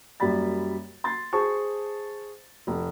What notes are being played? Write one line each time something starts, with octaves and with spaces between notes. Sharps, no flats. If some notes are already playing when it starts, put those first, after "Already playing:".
F#2 G3 A#3 D5 B5 A6
C6 A6
G#4 C5 A5 C#6
F1